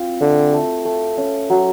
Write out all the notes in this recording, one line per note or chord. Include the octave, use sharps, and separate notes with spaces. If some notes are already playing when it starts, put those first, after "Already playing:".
Already playing: C4 F4
D3 A3
A3
A3
C#4
F#3